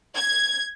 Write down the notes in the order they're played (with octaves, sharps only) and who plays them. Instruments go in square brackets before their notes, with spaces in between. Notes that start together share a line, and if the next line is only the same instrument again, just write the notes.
[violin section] G#6